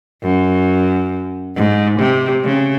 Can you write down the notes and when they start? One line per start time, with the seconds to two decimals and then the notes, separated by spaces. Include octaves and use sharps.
0.23 F#2
1.56 G#2
1.99 C3
2.44 C#3